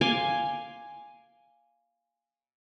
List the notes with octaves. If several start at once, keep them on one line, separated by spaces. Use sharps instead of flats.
F5 G#5 C6 D6